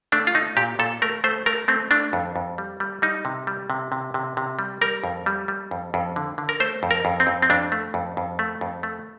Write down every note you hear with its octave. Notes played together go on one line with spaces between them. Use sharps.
A3 D4
F4
A3 D#4
A#2 G4
A#2 A4
A3 A#4
A3 C5
A3 A#4
A3 C4
A3 D4
F2
F2
G3
G3
G3 D#4
C3
G3
C3
C3
C3
C3
G3
G3 A#4
F2
G3
G3
F2
F2
D3
D3
A#4
A3 C5
F2
A#4
F2
C4
F2
C4
F2 D4
A3
F2
F2
A3
F2
A3